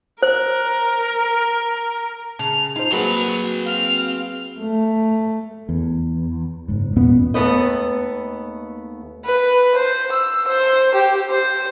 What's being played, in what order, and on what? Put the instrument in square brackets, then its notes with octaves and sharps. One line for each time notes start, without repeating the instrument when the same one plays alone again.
[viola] A#4 [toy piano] C5
[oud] C#3 [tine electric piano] A5 [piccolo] F7
[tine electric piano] D#4 C5 [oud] F4
[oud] F#3 A#3 [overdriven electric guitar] C4 B5 [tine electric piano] F#4 G#4 B4
[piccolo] F5
[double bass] A3
[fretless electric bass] E2
F#1 G#2
E2 A#2 B3 C#4
[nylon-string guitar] D#2 C#3 A3 B3 B4 D#5
[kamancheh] B4
C5
E6
C5
G4
C5